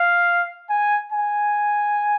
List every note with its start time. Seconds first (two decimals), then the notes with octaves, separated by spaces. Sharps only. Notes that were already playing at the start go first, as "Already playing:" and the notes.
Already playing: F5
0.69 G#5
1.12 G#5